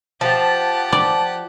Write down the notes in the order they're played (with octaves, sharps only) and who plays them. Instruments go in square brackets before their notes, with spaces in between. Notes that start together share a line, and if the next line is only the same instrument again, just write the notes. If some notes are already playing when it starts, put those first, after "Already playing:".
[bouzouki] F3 [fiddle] G4 F#5 [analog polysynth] A5
[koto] D5